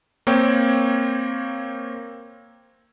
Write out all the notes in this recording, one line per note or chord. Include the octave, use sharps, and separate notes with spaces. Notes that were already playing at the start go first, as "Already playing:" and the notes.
A#3 C4 C#5 G5